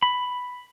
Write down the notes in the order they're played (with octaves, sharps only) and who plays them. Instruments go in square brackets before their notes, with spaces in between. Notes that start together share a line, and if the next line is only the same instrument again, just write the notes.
[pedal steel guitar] B5